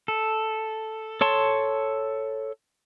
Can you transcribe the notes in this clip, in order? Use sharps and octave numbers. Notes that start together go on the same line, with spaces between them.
A4
A4 C#5 A5 C6